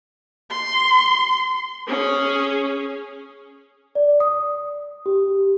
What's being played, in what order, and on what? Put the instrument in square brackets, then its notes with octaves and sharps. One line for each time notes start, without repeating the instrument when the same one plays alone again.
[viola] C6
C#4 G#4
[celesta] D5
D#6
G4